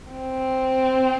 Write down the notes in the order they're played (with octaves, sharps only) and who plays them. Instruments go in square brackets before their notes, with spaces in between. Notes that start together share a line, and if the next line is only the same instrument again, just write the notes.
[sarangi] C4